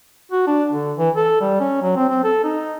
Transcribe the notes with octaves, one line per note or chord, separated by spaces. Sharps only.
F#4
D4
D3
E3
A4
G3
C#4
F#3
C4
C4
A4
D#4